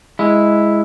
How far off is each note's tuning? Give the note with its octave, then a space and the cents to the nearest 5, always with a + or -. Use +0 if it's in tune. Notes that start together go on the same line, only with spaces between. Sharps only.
G#3 +0 E4 +0